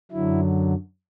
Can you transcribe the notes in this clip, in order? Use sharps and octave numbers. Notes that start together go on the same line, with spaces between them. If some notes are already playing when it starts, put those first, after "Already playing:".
F#2 D3 F#3 E4